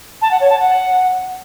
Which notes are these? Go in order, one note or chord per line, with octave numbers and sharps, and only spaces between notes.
A5
F#5
C#5
A5
F#5